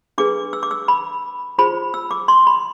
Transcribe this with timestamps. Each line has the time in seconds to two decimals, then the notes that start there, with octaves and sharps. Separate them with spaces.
0.18 D4 G#4 B4 D6
0.53 E6
0.63 D6
0.71 E6
0.88 B5
1.58 F4 G#4 C5 B5
1.94 E6
2.11 D6
2.28 C6
2.47 B5